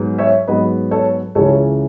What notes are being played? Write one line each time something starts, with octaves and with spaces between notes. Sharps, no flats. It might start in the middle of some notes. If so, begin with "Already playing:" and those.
Already playing: G#2 F#3 B3
C#5 E5
G#2 F#3 B3 B4 D#5
A4 C#5
C#2 C#3 E3 A4 C#5